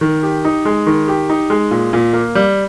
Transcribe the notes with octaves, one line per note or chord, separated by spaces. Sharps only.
D#3
G4
D#4
G#3
D#3
G4
D#4
G#3
A#2
A#2
A#3
G3